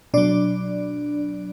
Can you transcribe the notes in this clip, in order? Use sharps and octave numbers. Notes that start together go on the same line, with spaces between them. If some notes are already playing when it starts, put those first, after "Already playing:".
B2 F#3 D4 D5